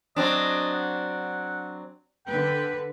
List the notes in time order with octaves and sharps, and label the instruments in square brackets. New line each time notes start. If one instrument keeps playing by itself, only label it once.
[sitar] F#3 C4 D4 [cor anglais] D#5
[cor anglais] F#5
[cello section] D3 B4 [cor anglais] G5